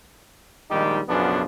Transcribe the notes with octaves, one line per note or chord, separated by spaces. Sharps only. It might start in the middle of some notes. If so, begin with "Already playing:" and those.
A#1 D#3 G3 G#3 D#4 G4
B1 F#2 C#3 F3 B3 D4